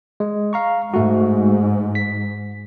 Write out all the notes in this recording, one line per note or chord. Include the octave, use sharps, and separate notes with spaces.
G#3
F5 A#5 C#6
G#2 A3 F#4
B6